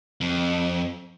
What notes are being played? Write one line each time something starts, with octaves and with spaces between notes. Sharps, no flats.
F2